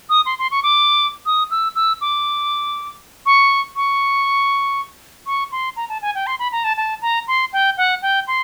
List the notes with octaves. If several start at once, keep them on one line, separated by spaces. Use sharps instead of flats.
D#6
C6
C6
C#6
D6
D#6
E6
E6
D6
C#6
C#6
C#6
C6
A#5
A5
G#5
G5
C6
B5
A#5
A5
A5
A#5
C6
G5
F#5
G5
C6